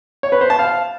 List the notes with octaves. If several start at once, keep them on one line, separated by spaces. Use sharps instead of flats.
C#5
B4
C5
A5
F5